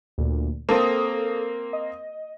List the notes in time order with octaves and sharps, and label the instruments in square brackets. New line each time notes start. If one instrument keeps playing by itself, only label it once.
[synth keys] D2 A#2
[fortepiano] A#3 C4 [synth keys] A4 D#6
[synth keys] D#5